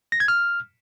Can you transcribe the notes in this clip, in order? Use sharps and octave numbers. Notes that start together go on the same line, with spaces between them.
A#6
G#6
F6